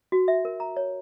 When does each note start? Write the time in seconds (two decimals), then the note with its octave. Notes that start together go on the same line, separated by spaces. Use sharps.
0.12 F#4
0.28 E5
0.45 A#4
0.60 A#5
0.77 C#5